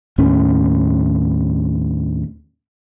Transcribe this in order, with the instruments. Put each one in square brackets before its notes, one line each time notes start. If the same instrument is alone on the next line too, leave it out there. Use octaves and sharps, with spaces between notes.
[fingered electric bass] D#2 A2 C#4